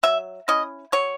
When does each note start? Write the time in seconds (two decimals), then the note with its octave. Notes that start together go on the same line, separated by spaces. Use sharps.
0.03 F#3 E5
0.48 C#4 E4 D#5
0.92 F#3 C#5